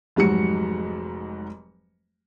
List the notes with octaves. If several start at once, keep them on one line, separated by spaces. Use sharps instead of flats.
F1 G#2 F#3 F#4 C#7